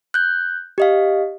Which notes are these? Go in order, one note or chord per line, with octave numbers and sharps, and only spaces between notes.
F#6 G6
G4 D#5 F5